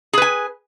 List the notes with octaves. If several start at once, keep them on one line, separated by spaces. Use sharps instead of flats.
G#4 B4 G#5